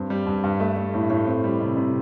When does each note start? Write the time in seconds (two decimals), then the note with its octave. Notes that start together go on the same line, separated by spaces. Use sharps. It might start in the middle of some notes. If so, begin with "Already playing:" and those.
Already playing: G2 C4
0.10 G3
0.26 G2
0.44 G2
0.60 A3
0.77 A3
0.94 A2
1.10 A2
1.27 C4
1.44 G3
1.60 C3
1.77 C3